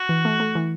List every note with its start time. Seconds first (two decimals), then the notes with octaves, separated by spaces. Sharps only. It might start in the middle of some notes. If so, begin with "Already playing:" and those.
Already playing: F#4
0.09 E3
0.25 A3
0.40 A3
0.55 E3